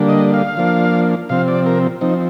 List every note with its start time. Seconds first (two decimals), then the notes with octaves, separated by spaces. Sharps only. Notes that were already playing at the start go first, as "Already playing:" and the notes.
Already playing: D3 G3 A#3 D4
0.09 D#5
0.34 F5
0.57 F3 A#3 D4
1.29 C3 F3 C4 F5
1.48 D5
1.66 A#4
2.01 F3 C4 D#4